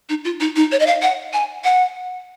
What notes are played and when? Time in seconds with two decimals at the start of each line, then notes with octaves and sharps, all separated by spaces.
0.09 D#4
0.25 F4
0.40 D#4
0.56 D#4
0.72 C#5
0.80 D#5
0.87 F5
1.02 F#5
1.33 G#5
1.64 F#5